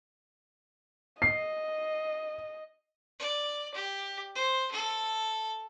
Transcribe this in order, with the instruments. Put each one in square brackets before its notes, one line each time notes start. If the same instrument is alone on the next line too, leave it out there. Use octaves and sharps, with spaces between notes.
[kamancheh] D#5 [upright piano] C7
[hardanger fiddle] D5
G4
C5
A4